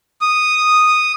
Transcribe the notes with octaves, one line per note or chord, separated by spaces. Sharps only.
D#6